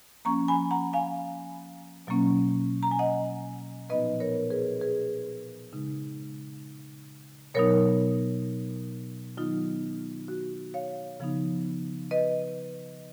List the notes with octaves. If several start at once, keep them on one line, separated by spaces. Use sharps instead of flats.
F3 A#3 C#4 A#5 C#6
G#5 B5
F#5 A#5
F5 G#5
B2 F#3 A#3 C#4
A#5
G#5
D#5 F#5
A#2 F3 B3 D#4 B4 D#5
A#4 C#5
G#4 B4
G#4 B4
C#3 G#3 D#4
B2 F#3 B3 D#4 A#4 C#5
D#3 F#3 B3 D#4 F4
F#4
C#5 F5
C#3 F3 B3 D#4
B4 D#5